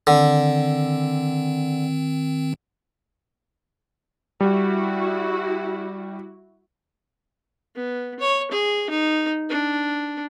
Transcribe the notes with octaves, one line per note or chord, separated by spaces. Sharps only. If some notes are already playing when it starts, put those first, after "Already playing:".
D3 D#3 C4
G3 E4 F#4
B3
C#5
G#4
D#4
D4